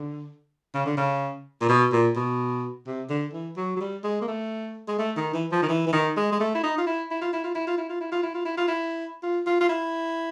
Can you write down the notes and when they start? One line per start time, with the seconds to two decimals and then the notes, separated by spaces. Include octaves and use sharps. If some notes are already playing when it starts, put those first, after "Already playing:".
Already playing: D3
0.74 C#3
0.86 D3
0.97 C#3
1.61 A#2
1.69 B2
1.92 A#2
2.16 B2
2.87 C3
3.10 D3
3.33 E3
3.57 F#3
3.77 F#3
3.80 G3
4.04 G#3
4.21 A#3
4.28 A3
4.88 G#3
4.99 A3
5.16 D#3
5.34 E3
5.52 F3
5.62 D#3
5.69 E3
5.87 E3
5.92 D#3
6.17 G#3
6.32 G#3
6.40 A3
6.55 E4
6.63 D#4
6.78 F4
6.87 E4
7.11 E4
7.22 F4
7.33 E4
7.44 F4
7.55 E4
7.67 F4
7.78 E4
7.89 F4
8.00 E4
8.12 F4
8.23 E4
8.34 F4
8.45 E4
8.57 F4
8.68 E4
9.23 F4
9.46 F4
9.61 F4
9.69 E4